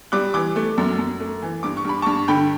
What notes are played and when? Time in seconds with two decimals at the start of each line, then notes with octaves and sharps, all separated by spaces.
0.12 G3 D6 F#6
0.34 E3 D6 F#6
0.56 A3
0.78 F#2
0.98 F#2
1.20 A3
1.42 E3
1.63 G2 D6
1.77 C#6
1.85 G2 B5
2.02 G2 A5 C#6
2.28 D3 G5 B5